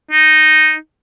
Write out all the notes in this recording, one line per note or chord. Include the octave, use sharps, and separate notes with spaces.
D#4